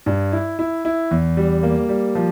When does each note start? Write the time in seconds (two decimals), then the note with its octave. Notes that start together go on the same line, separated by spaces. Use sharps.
0.06 G2
0.33 E4
0.59 E4
0.85 E4
1.11 E2
1.37 G3
1.63 A#3
1.89 G3
2.15 F3